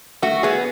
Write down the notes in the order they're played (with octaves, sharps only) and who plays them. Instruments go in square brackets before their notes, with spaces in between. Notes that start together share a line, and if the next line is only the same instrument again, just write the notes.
[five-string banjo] A3 [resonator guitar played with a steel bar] F#4
[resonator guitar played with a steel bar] B3 [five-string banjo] G#4